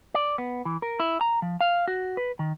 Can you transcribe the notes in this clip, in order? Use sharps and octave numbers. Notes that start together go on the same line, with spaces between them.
D5
B3
E3
A#4
E4
A#5
F3
F5
F#4
B4
D#3